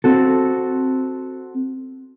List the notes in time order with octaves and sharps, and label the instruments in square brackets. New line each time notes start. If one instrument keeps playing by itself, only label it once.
[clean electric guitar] C4 F#4 A4